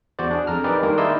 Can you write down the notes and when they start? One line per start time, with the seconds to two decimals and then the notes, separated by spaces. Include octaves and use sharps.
0.19 E2 F#4 C5 D5
0.31 D4 G#4
0.47 F2 A#5 F6
0.64 D#4 G4 G#4 A#4 B4 D5
0.82 D#3 G3 G#3 A#3 D4 A#4
0.98 D#4 E4 D5 D#5 C6 E6